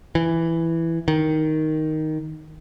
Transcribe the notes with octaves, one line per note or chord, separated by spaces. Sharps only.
E3
D#3